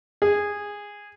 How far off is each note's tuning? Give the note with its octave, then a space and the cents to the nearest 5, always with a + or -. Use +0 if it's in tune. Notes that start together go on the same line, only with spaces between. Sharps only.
G#4 -15